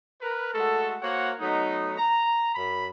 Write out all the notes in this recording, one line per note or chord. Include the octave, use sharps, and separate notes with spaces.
A#4 B4
G#3 A3 F#4 A4
A#3 F#4 A#4 C5 C#5 F#5
F#3 A3 B3 D#4
A#5
F#2 B5